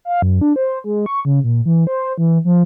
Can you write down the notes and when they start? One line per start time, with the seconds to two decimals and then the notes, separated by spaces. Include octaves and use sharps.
0.05 F5
0.22 F#2
0.41 D4
0.56 C5
0.84 G#3
1.06 C#6
1.25 C#3
1.44 A#2
1.65 E3
1.87 C5
2.18 E3
2.45 F3